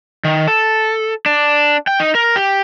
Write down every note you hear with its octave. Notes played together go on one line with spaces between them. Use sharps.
D#3
A4
D4
G5
D#4
A#4
G4